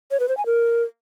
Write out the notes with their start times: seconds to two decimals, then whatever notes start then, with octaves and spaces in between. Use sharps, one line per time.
0.11 C#5
0.20 B4
0.29 C5
0.37 G#5
0.46 A#4